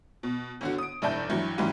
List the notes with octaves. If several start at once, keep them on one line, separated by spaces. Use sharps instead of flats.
B2
G1 D3 F#4
D#6 D7
F1 G2 E4 D5 A5 G6
G2 E3 F#3
G#2 E3 F#3 G3 C#4